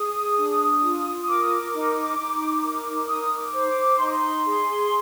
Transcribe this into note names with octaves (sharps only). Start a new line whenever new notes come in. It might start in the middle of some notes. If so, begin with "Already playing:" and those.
Already playing: G#4 D#6
D4
F4
A#4 D6
D#6
D6
D#4
D#4
A#4
D#4 D#6
D6
C5
D6
D#4 C6
D6
C6
G#4